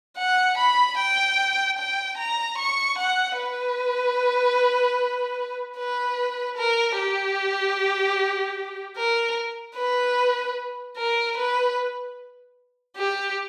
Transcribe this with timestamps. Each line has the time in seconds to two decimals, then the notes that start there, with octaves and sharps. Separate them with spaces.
0.18 F#5
0.58 B5
0.98 G5
1.78 G5
2.18 A#5
2.58 C#6
2.98 F#5
3.38 B4
5.78 B4
6.57 A#4
6.98 G4
8.97 A#4
9.77 B4
10.97 A#4
11.37 B4
12.97 G4